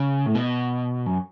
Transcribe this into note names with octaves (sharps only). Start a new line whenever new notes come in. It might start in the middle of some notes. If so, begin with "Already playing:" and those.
Already playing: C#3
A2
B2
F#2